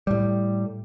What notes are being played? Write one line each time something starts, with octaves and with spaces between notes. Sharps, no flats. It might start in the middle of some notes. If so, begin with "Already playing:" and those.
A2 G3